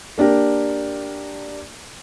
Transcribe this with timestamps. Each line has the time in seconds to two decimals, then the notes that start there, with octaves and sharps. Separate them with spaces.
0.18 A#3 D4 G4 A#4